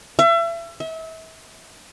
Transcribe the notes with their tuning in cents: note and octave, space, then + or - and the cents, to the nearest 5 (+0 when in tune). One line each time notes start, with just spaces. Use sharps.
E5 +35
E5 -35